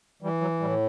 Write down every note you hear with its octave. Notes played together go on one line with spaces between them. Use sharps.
E3 G3
F#3
A2 G3